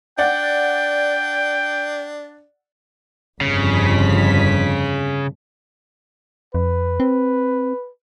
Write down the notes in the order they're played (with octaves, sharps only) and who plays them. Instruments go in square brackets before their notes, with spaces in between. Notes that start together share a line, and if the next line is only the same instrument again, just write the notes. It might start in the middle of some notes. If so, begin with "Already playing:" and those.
[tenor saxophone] D4 [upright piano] D5 F#5 [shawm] G5
[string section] G1 F2 B6 [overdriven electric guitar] C#3
[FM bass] F2 [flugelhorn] B4
[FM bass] C4